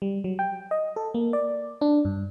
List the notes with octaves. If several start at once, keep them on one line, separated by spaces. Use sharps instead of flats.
G3
F#3
G5
D#5
A4
A#3
D5
D4
G2